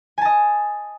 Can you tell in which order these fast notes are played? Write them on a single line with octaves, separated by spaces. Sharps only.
G#5 A5 D#5